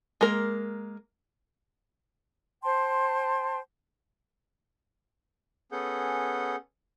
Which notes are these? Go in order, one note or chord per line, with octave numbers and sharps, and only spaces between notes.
G#3 A#3 A#4
C5 G5 A5 C6
B3 C#4 G#4 A4 F#5 G6